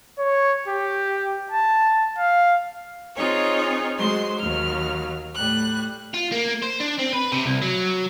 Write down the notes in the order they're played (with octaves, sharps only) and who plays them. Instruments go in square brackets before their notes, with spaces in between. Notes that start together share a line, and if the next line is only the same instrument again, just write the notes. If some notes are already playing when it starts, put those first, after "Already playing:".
[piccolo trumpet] C#5
G4
A5
F5
[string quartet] C4 D#4 F4 G#4 C#5
F#3 G#3 C5 C6
D#2 F#3 F6
A2 G3 F#6
[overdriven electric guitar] F4
A#3
C5
D4
C4
B4
C3
C2
F#3